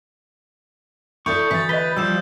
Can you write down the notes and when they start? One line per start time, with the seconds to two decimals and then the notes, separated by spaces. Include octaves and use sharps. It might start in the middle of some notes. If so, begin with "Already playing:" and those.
1.26 E4 A4 D5 C#6 D#6 G6
1.51 D2 E3 A6 B6
1.69 B4 D#5 B6 G7
1.97 F3 G3 E6 G6 E7